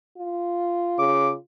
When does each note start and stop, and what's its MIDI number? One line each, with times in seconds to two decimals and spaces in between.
0.18 1.37 65
0.98 1.34 49
0.98 1.30 86